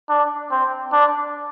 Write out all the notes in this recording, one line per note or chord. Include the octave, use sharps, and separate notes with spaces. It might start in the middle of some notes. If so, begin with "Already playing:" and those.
D4
C4
D4